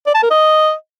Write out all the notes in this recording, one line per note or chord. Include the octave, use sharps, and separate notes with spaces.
D5
A5
A#4
D#5